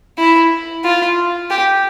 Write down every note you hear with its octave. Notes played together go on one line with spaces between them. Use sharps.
E4
F4
G4